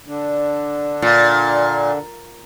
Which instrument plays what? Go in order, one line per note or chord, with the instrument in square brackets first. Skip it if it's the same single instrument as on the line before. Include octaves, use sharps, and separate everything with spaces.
[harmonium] D3 D4
[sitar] A#2